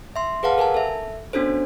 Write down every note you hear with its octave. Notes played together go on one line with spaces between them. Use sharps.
E5 C6
G#4 B4 F5 F#5 A5
A4 A#4 G#5 A5
A4 E5
B3 C#4 D4 F#4 A4 C5